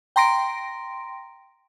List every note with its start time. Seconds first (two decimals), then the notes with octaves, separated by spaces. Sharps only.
0.16 G5 A#5 C6 A#6 D7